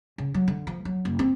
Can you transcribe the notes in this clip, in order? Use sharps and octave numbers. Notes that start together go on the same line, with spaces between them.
C#3
F#3
D3
F3
F#3
F#1
C4